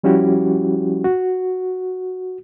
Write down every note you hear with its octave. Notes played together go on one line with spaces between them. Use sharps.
F3 G3 C#4 E4 F#4 G4
F#4